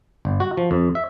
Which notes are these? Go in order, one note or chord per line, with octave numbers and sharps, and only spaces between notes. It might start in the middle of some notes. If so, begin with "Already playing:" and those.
G1
F#4
F3
F2
E5